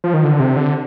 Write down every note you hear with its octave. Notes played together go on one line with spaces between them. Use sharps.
F3
D#3
D3
C3
D3